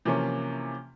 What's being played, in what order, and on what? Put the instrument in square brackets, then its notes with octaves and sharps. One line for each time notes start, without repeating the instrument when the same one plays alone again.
[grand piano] C3 E3 F3 A#3 C#4